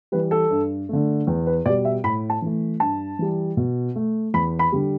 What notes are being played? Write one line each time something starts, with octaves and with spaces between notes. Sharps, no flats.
E3 G3 B4
A4
G2
D3 A3
E2
B4
B2 G3 D5
E5
A2 B5
A5
E3 A3
G2 A5
E3 G3
B2
A3
E2 B5
B5
D3 G3